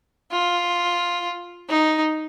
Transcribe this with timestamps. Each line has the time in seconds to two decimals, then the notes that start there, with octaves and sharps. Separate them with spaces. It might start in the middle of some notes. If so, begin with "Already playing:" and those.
0.32 F4
1.69 D#4